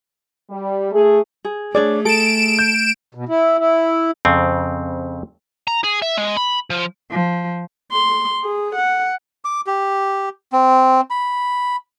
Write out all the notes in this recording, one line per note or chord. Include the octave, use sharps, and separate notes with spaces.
G3
A3 G#4
G#4
A3 D4 G#4 C#5 D5
A4 D7 E7
G6
B2
E4
E4
F2 C#3 C4
A#5
G#4
E5
G#3
B5
F3
F3
C6
G#4
F#5
D6
G4
C4
B5